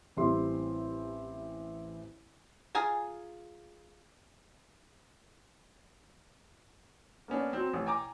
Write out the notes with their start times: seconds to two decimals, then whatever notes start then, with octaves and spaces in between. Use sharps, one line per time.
0.16 A1 G3 C4 E4 G4 C6
2.75 F4 G#4 G#5 A#5
7.28 A#3 B3 C#4 D4
7.53 F#3 C4
7.73 A1
7.86 G5 G#5 A#5 D6